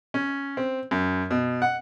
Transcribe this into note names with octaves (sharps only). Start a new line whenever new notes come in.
C#4
C4
F#2
B2
F#5